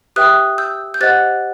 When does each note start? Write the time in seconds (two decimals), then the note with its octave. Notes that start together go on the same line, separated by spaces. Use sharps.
0.16 G4 B4 E5 G5 D#6 F#6
0.58 E6 G6
0.94 G6
1.01 G4 C5 D#5 F#5 F#6 A6